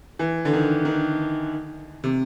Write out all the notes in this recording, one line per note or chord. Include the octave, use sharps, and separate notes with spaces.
E3
D3
D#3
D#3
C3